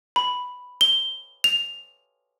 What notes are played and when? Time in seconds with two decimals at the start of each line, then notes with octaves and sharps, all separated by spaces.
0.16 B5
0.81 G7
1.44 F7